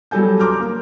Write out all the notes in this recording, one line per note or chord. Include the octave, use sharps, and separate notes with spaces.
F#3 G3 A4 G#5 G6
A#5 C6 D6 F6 G6
A#3